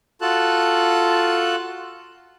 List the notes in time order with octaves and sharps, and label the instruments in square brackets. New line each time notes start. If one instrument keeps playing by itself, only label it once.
[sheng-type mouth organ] F4 F#4 A4 A5 F#6